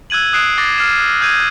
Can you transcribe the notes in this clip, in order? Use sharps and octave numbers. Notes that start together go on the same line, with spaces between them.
E6 F#6 G#6 D#7 F#7
D#6 F#6 C7 D7 E7
D6 A6 A#6 C7 G7
F6 C7 E7
E6 G6 G#6 D#7